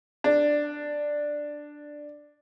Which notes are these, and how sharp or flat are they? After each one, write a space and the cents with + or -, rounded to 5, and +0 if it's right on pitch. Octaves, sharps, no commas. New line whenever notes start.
D4 +5